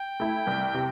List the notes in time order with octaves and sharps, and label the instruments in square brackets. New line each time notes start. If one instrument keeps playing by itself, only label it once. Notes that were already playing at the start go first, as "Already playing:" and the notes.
Already playing: [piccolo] G5
[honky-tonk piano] A3 E4
C2
C3